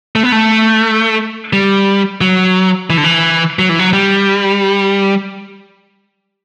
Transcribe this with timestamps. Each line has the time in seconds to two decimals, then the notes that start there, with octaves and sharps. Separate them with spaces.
0.16 A3
0.23 B3
0.32 A3
1.53 G3
2.21 F#3
2.90 E3
2.98 D3
3.04 E3
3.59 F#3
3.69 E3
3.79 F#3
3.93 G3